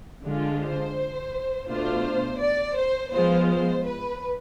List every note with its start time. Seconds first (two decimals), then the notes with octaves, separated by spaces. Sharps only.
0.23 D3 G#3 D4 F4
0.60 C5
1.69 B2 A3 D4 F4 C5
2.41 D5
2.78 C5
3.13 F3 G#3 B3 F4 C5
3.50 C5
3.86 B4